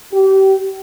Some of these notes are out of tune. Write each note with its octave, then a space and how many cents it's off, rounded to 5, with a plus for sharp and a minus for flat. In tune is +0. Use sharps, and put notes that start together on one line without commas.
G4 -30